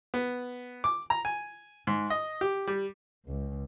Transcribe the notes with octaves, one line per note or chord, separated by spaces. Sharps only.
B3
D6
A#5
G#5
G#2
D#5
G4
G3
C#2